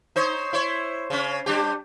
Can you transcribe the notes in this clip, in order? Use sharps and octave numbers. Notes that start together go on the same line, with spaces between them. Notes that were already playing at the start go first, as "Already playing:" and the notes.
D#4 C5 C#5
E4 C5 C#5
C#3 C#4
G3 D4 G4